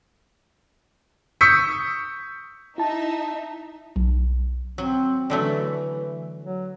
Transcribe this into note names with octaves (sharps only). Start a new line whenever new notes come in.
C#6 D#6 E6 G6 B6 C#7
D#4 E4 E5 A5
B1
F#3 C4
D3 E3 F#3 A3
F#3